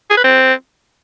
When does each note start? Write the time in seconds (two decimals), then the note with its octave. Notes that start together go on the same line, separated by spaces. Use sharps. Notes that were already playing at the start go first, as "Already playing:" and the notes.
0.10 G#4
0.17 B4
0.24 C4